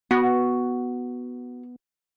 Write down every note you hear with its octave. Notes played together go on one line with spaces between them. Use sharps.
B3 F#4